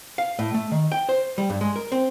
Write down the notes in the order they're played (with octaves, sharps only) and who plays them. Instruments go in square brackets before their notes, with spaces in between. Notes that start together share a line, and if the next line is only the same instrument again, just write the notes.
[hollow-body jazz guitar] F5
A2
A3
D#3
G5
C5
G3
G2
G#3
A#4
C4